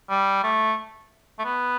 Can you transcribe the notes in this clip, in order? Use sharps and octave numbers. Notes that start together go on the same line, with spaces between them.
G3
A3
A3
B3